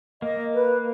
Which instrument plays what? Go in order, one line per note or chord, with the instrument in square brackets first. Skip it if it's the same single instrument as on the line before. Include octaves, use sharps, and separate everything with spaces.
[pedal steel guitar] A#3 [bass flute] D#5
[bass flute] B4